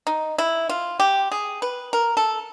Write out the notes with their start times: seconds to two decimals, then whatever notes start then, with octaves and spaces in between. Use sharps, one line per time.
0.07 D#4
0.38 E4
0.69 F4
1.00 G4
1.32 G#4
1.62 B4
1.93 A#4
2.17 A4